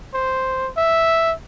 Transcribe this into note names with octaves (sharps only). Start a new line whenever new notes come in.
C5
E5